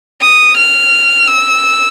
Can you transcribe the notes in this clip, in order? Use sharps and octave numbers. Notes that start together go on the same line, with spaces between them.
D#6
F6
E6